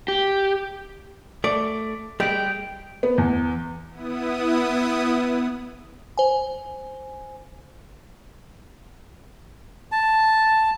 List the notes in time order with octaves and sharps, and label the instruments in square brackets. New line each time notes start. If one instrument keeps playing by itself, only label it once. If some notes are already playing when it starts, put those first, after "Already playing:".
[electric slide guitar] G4
[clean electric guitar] A3 [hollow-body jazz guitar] D5
[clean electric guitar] G3 G4 [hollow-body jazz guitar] G#3 [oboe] G5
[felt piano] B3
E2
[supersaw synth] B3 E4 D#6
[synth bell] C5 G#5
[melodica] A5